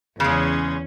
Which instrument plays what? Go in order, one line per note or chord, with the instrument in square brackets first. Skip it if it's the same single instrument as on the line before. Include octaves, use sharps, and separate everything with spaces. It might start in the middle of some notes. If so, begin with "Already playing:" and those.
[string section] E2 C#4 [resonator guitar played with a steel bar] C#3 G#3